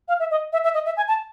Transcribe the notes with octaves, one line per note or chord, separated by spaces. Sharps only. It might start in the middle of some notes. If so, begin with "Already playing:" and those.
F5
E5
D#5
E5
E5
D#5
E5
G#5
A5